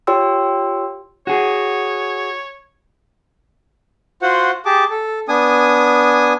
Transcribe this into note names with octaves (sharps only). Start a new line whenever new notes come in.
F4 G4 C#5 G5 C6 E6
F#4 G#4 C#5
F4 F#4 C5 F#5
G4 G#4 A5 D6
A4
B3 D4 G#5 D#6